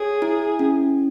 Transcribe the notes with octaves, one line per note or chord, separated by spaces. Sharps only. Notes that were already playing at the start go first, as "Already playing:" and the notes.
Already playing: G#4 C#5 G#5
E4
C#4